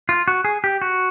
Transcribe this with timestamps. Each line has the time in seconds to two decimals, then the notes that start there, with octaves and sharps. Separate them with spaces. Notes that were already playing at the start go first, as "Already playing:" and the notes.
0.09 F4
0.28 F#4
0.45 G#4
0.64 G4
0.82 F#4